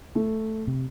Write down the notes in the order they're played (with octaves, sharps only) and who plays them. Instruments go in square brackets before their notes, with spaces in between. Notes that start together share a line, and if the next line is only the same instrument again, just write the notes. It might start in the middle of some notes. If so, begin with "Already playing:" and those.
[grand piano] A3
[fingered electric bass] C3